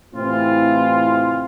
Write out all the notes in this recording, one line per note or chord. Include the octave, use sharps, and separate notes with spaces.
A2 C3 E3 C4 F4